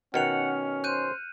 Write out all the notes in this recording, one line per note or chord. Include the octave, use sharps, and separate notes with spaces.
B2 D#3 C#4 F#5 F6 C#7 F7
C5 F#6 G6 D#7